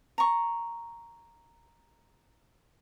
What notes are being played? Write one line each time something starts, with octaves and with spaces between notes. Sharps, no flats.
A#5 C#6